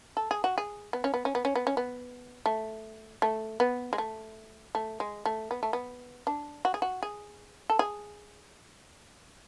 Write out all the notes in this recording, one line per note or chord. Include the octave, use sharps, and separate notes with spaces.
A4
G#4
F#4
G#4
B3
C#4
B3
C#4
B3
C#4
B3
C#4
B3
A3
A3
B3
G#3
A3
A3
G#3
A3
B3
A3
B3
D4
F#4
G#4
F#4
G#4
A4
G#4